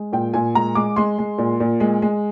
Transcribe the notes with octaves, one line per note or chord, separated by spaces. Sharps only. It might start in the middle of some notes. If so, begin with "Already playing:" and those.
Already playing: G#3
A#2 G5
A#2 G#5
G#3 A#5
G#3 D6
G#3 C6
G#3
A#2
A#2
G#3
G#3